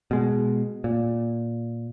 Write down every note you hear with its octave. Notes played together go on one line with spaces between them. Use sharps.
B2 G#3
A#2